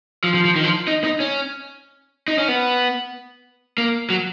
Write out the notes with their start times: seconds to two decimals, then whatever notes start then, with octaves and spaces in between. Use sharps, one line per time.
0.24 F3
0.34 F3
0.45 F3
0.56 D#3
0.64 F3
0.88 D#4
1.04 D#4
1.20 C#4
2.28 D#4
2.38 C#4
2.48 B3
3.78 A#3
4.10 F#3